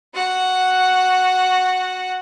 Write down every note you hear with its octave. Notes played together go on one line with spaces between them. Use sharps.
F#4 F#5